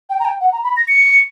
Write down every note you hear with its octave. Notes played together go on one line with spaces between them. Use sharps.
G5
A#5
G5
F#5
A#5
B5
A#6
C#7